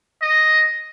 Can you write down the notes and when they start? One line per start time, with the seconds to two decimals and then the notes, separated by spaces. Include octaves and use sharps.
0.22 D#5